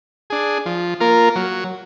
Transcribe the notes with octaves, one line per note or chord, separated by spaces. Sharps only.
D4 G#4
F3
A#3 F4 A#4
F#3